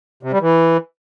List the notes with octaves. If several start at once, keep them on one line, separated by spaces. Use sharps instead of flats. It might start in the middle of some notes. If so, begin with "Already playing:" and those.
C3
G3
E3